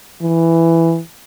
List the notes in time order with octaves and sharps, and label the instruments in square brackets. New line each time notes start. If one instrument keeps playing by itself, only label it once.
[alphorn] E3